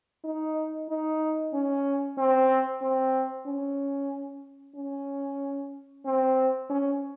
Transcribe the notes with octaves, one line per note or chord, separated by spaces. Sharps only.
D#4
D#4
C#4
C4
C4
C#4
C#4
C4
C#4